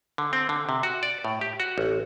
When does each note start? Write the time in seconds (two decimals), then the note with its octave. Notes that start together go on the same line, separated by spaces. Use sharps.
0.18 D3
0.33 C4
0.49 D3
0.69 C3
0.83 F#4
1.03 D5
1.25 A2
1.41 G4
1.60 F#4
1.78 A1